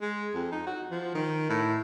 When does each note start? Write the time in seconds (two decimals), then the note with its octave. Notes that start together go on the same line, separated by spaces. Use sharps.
0.02 G#3
0.35 F2
0.52 D#4
0.67 F#4
0.91 F3
1.15 D#3
1.50 A2